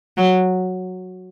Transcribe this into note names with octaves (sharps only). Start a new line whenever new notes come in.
F#3